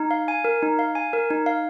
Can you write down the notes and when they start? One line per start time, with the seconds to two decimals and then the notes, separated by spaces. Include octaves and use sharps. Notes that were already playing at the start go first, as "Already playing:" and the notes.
Already playing: D#4
0.11 F5
0.28 G#5
0.45 A#4
0.62 D#4
0.79 F5
0.95 G#5
1.13 A#4
1.30 D#4
1.46 F5